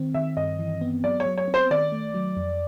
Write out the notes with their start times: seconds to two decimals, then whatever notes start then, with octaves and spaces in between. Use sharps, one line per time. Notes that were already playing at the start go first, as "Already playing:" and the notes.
Already playing: D#3 C4
0.14 D#3 E5
0.37 G2 D#5
0.59 E3
0.81 B3
1.04 F#3 D5
1.20 C#5
1.26 F#3
1.38 C#5
1.48 C4
1.54 C5
1.71 D#3 D5
1.92 A3
2.14 F#3
2.37 F2